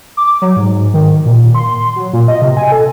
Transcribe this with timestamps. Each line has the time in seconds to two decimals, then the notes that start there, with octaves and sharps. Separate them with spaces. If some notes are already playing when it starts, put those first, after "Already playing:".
0.17 D6
0.42 F#3
0.56 G#2
0.94 D#3
1.26 A#2
1.55 C6
1.96 F#3
2.13 A#2
2.28 D#5
2.42 C3
2.57 G#5
2.72 A4